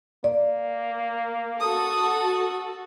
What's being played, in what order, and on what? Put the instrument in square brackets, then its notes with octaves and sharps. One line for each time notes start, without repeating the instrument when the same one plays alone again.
[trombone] A#3 [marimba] D5
[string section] F#4 A4 [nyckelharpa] D#6